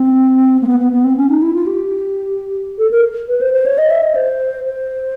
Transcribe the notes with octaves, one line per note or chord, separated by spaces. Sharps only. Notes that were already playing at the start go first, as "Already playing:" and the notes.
Already playing: C4
A#3
B3
B3
B3
C4
C#4
D#4
E4
F4
G4
A4
A#4
B4
C5
C5
C#5
D#5
E5
D#5
C5
C5